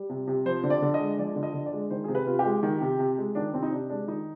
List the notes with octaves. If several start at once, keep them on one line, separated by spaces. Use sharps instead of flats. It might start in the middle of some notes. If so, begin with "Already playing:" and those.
Already playing: G3
C3
C3
F3 C5
D3
D5
D3
D#5
G#3
F3 D5
D3
D#5
D3
D5
G#3
D#3 C5
C3 G#4
B4
C3 F4
G4
G#3
D#3
C3
C3
G#3
D#3 D4
C3 C4
D#4
C3 D4
G#3 D4
D#3 D#4